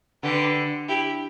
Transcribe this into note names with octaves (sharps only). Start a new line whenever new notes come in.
D3 G4 B4
E4 G4